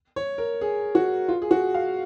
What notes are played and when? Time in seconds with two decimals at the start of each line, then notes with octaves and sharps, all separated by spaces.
0.16 C#5
0.38 A#4
0.61 G#4
0.95 F#4
1.28 F4
1.42 G#4
1.51 F#4
1.74 F5